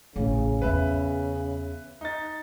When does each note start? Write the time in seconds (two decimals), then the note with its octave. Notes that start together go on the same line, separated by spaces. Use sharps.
0.16 A1 C#3
0.62 E2 C#4 B4 E5
2.01 D#4 A6